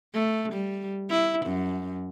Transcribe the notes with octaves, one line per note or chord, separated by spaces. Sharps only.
A3
G3
E4
F#2